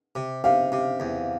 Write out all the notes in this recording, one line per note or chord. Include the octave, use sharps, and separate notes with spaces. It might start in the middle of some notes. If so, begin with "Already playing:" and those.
C3
C3 F5
C3
E2